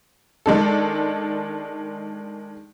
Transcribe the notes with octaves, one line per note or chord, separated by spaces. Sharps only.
D#3 G#3 D4 A4